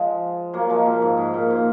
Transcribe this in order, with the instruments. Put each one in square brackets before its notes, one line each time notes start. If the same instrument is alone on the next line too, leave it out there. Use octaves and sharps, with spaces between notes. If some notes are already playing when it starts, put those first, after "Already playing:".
Already playing: [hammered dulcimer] F3 G#3
F#3 A#3
F3 G#3
A#2
G#2
G#2
A#2
A#2